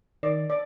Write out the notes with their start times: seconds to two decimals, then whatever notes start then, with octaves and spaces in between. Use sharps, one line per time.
0.23 D#3 D5
0.50 D5